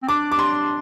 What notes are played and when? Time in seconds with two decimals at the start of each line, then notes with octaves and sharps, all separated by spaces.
0.03 C4
0.08 D4 D6
0.32 D6
0.39 C6